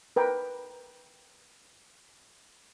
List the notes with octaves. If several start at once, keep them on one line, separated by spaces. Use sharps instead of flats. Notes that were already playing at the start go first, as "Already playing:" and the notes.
A#4 B4 G5